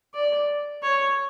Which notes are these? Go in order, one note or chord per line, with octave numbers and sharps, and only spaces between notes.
D5
C#5